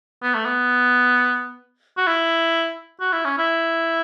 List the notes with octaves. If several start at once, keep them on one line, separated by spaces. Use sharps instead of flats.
B3
A3
B3
F#4
E4
F#4
E4
C#4
E4